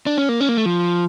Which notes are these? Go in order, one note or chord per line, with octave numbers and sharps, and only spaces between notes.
D4
C#4
A#3
C#4
A#3
A3
F3